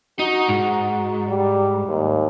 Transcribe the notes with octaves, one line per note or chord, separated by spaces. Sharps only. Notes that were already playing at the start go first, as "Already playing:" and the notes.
D#4 F#4
G#2
G3
D#2